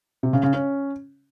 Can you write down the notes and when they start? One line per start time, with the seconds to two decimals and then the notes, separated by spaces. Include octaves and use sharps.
0.23 C3
0.33 C#3
0.43 C#3
0.54 C#4